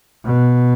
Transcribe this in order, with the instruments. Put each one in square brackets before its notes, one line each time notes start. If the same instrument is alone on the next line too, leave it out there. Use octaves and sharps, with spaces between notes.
[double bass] B2